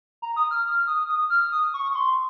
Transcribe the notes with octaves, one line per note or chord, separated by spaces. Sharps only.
A#5
D#6
F6
F6
D#6
D#6
F6
D#6
C#6
C#6
C6